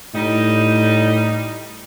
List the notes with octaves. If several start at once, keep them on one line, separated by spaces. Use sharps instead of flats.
A2 G3 D#4